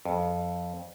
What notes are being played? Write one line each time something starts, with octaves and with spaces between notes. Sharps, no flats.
F2